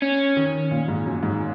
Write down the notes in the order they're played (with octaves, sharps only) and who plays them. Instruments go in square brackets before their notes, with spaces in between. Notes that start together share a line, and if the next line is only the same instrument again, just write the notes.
[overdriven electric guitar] C#4
[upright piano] D#3
A#2
G#2
F#2
G#2